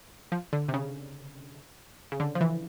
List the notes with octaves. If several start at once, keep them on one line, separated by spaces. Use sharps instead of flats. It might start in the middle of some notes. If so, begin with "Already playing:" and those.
F3
D3
C3
C#3
C#3
D3
F3
E3